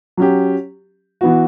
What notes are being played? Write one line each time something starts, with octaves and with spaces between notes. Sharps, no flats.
F#3 C#4 G4
E3 B3 F#4